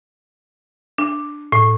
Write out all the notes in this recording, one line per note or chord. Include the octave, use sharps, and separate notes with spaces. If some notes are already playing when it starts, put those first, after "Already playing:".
D4
A2